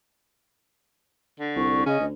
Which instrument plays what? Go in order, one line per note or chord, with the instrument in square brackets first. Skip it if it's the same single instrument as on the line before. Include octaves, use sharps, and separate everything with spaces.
[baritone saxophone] D3
[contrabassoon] C2 [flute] C#6
[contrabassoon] C#3 [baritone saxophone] C#4 [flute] D#5
[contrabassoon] D2